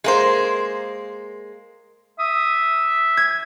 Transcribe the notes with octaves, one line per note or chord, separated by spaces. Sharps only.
G#3 A#3 C5
E5 D#6
G#6